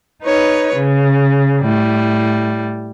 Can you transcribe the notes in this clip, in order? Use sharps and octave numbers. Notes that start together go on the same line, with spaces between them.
D#4 B4 C#5
C#3
A2 G3